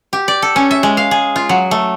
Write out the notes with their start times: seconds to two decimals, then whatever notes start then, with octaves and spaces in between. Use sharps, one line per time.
0.13 G4
0.28 D5
0.42 A4
0.56 C#4
0.71 E5
0.83 G#3
0.97 F5
1.11 G#4
1.36 F4
1.49 F#3
1.71 A3